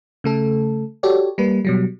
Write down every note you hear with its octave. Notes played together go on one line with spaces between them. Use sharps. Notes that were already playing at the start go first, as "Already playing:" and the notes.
C#3 A3 A4
F#4 G4 A4 C#5 D5
G3 A#3 B4
B2 F#3 G3